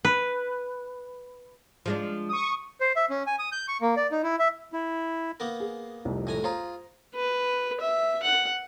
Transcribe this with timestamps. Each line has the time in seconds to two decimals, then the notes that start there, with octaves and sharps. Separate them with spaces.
0.05 B4
1.86 F3 G#3 D4
2.29 C#6 D#6
2.81 C5
2.96 E5
3.10 C#4
3.27 G#5
3.39 D#6
3.52 G6
3.68 C#6
3.81 A#3
3.97 D5
4.11 D#4
4.23 E4
4.39 E5
4.73 E4
5.40 A#3 B3 A#4
5.60 G#4
6.05 F1 C2 F2
6.27 A2 G#5 A#5
6.44 F4 G#4 C5 A#5
7.15 B4
7.81 E5
8.23 F#5